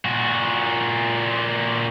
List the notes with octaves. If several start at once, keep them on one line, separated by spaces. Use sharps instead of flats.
A#2 F#4